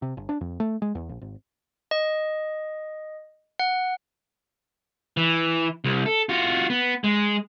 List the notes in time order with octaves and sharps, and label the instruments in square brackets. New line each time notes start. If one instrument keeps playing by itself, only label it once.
[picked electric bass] C3
G1
D4
F2
A3
G#3
E2
A#1
G#1
[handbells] D#5
F#5
[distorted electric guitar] E3
C2
A4
F4 F#4
B3
G#3